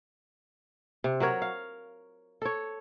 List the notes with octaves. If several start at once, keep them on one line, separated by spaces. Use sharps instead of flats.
C3
F#3 F#4 A#4 C#5
F5
A4 C#5